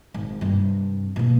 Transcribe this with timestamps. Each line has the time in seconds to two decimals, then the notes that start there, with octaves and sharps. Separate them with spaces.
0.14 G#1
0.41 G2 C3
1.16 B2 A#3